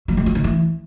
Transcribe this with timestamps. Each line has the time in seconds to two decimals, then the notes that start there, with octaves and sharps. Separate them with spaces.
0.08 F#3
0.17 G#3
0.26 F#3
0.35 D#3
0.44 E3